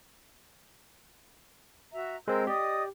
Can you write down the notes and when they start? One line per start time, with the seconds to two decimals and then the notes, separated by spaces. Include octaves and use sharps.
1.92 F#4 E5 A#5
2.28 G#3 C4 A#4 E6 G6
2.47 G4 D5 D#5 D#6